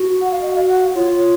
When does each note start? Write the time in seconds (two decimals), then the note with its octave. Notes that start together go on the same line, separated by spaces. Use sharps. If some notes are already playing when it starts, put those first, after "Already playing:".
Already playing: F#4
0.21 F#5
0.31 F5
0.42 D#5
0.55 F5
0.69 F#5
0.95 F4 C#5